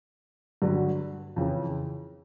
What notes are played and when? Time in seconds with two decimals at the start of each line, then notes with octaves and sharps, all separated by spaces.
0.62 G2 D3 F#3
1.36 F2 C#3 E3